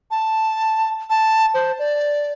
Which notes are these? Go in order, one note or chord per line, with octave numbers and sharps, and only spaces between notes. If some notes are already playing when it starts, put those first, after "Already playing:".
A5
A5
C5
D5